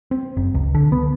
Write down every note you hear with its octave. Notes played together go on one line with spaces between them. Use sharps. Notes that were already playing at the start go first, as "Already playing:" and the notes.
C4
F#1
C#2
D3
B3